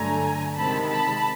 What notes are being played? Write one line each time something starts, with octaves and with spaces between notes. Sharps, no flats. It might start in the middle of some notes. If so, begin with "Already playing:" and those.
Already playing: G2 D3 F#3 A3 G#5 A#5
C3 D#3 G#3 C4 A5 B5
A5 B5